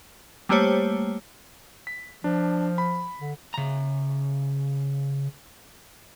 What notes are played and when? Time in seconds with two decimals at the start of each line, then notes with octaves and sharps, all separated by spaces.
0.49 G3 A3 A#3 G4 C5 C#5
1.87 B6
2.24 F3 D4
2.78 B5
3.21 D3
3.54 C#3 A#5